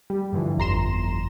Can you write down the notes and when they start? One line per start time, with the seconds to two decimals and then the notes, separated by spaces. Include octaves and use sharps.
0.10 G3
0.33 G2 D3 E3 F3
0.57 G1 F2 A#5 C6 E7